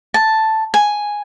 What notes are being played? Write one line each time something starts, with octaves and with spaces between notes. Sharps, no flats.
A5
G#5